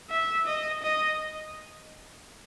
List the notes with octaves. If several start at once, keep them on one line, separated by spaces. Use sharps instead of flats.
E5
D#5
D#5